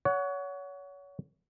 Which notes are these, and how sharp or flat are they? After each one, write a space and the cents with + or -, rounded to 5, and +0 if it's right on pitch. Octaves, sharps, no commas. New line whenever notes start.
C#5 +30 F#5 +0